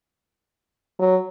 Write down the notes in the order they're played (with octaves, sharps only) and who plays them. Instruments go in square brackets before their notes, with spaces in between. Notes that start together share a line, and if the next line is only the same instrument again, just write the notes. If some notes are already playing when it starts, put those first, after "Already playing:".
[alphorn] F#3